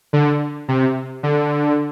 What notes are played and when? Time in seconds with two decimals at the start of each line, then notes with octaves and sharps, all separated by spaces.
0.13 D3
0.68 C3
1.23 D3